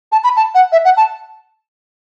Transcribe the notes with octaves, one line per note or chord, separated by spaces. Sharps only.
A5
B5
A5
F#5
E5
F#5
A5